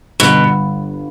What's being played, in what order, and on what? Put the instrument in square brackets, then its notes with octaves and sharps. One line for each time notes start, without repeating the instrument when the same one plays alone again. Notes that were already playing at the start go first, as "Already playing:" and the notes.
[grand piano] G1 [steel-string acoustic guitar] B2